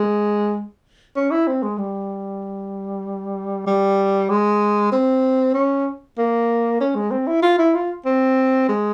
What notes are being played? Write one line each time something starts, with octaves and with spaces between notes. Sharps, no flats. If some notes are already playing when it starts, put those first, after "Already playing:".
Already playing: G#3
C#4
E4
C4
G#3
G3
G3
G#3
C4
C#4
A#3
C#4
G#3
C4
E4
F4
E4
F4
C4
G#3